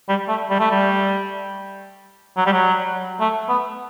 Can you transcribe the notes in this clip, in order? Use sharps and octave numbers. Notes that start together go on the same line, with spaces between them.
G3
A3
G3
A3
G3
F#3
G3
F#3
A3
B3